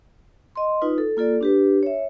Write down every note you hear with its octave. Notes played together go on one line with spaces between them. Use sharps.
D#5 C6
D#4 F4 B4
A4
A#3 F4 A4 D5
D4 G4 B4
C#5 E5